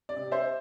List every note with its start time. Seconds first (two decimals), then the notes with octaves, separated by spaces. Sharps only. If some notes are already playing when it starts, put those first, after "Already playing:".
0.09 D5
0.16 C3
0.31 C5 E5